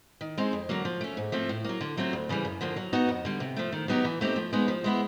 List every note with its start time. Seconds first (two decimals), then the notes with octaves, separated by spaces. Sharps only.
0.21 D#3
0.38 G#3 C4 D#4
0.53 F2
0.69 D3 F#3 A#3
0.85 F3
1.01 A3 C#4
1.17 G#2
1.32 F3 A3 C4
1.49 A2
1.65 F#3 A#3
1.81 D3
1.97 F#3 A3 C4 F4
2.13 D2
2.29 C#3 E3 G3
2.45 F#2
2.61 D3 F3 A#3
2.76 F#3
2.93 B3 D#4 F#4
3.09 F2
3.25 D3 G3
3.40 C3
3.57 F3 A3
3.72 D#3
3.88 F#3 B3 D#4 G4
4.05 E3
4.21 A3 C4 D#4 G4
4.36 F3
4.53 G#3 B3 D#4
4.68 F3
4.84 G#3 B3 E4